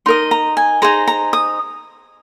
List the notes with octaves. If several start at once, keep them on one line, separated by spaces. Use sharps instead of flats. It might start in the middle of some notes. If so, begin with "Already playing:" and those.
D#4 A#4 D#5 C6
A#5
G#5
D#4 G#4 C5 A#5
A#5
D#6